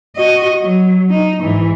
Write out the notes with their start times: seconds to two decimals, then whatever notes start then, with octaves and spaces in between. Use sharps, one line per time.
0.16 F#4 D#5
0.60 F#3
1.10 D#4
1.43 G#2 E3